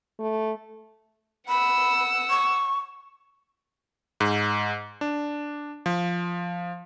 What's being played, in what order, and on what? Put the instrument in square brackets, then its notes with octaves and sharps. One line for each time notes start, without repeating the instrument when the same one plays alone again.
[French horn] A3
[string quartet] F#5 E6 [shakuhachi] B5
[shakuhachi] C#6
[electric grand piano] G#2
D4
F3